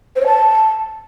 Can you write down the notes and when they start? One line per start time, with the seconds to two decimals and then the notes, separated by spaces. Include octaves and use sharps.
0.16 C5
0.21 C#5
0.26 A5